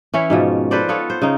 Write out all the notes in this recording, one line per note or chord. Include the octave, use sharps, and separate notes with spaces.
E3 C#4 E4 C#5
G#2 B2 F3
A4 B4 C5 D5
B3 F4 A4 C#5
C5
C#3 D#4